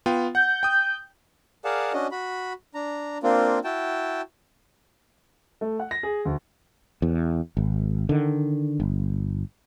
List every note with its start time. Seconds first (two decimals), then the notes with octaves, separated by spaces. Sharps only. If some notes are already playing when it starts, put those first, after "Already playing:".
0.06 B3 F4 G5
0.35 F#5 G6
0.63 G5 D#6
1.65 G#4 A#4 D5 F5 F#5 A5
1.93 C#4 D4 F#4 D#5
2.11 F#4 B5
2.74 D4 A#5
3.23 A#3 C4 D4 F4
3.64 E4 F#4 G5 A5
5.61 A3
5.80 F#5
5.91 A#6
6.03 G#4
6.25 D2
7.02 E2
7.57 G#1
8.09 D3 D#3
8.80 G1